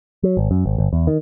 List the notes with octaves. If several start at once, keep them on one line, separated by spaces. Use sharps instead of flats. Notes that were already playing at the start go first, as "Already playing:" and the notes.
F#3
G#1
F#2
G#1
G1
E2
D#3